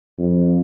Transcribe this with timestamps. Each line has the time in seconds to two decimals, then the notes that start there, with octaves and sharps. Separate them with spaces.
0.18 F2